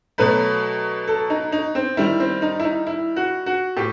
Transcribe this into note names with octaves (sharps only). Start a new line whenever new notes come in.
B2 F#3 A3 B4
A4
D#4
D#4
C4
D#3 G3 E4
C4
D#4
E4
D#4
E4
F#4
F#4
A2 G4